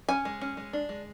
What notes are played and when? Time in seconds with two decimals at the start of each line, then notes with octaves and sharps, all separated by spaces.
0.09 C#4 G#5
0.25 G#3
0.41 C#4
0.57 G#3
0.73 D4
0.89 G#3